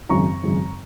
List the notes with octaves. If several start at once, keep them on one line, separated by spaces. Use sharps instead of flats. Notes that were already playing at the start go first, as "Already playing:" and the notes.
G#1 F#2 C#3 G#3 A#5 C#6
G#1 F#2 C#3 G#3